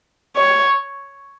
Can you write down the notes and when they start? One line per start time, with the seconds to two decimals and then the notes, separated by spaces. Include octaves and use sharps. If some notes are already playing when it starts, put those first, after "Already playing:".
0.37 C#5